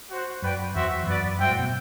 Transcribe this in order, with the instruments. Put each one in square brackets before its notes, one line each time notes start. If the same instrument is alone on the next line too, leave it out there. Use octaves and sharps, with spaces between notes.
[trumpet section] F#4 C5 F#5
[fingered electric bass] F#2 [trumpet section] F#4 B4 D5 G5
[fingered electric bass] E2 [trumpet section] C4 F#4 C5 E5
[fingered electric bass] F#2 [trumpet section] B3 F#4 B4 D5
[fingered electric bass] G2 [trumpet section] F#4 C5 E5 G5
[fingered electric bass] A2
B2